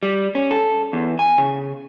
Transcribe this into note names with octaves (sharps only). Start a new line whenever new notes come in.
G3
C#4
A4
E2
G#5
C#3